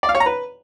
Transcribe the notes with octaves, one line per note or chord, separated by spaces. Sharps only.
D5
F5
C#5
A#5
B4